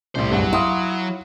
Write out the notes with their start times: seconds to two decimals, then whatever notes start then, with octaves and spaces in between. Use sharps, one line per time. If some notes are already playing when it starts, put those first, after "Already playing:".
0.15 C2 A2 G3 C5
0.31 E2 G2 F#3
0.53 E4 F5 F#5 C6 D#6